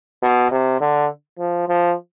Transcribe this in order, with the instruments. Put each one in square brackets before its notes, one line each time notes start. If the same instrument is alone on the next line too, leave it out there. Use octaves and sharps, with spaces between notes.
[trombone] B2
C3
D3
F3
F3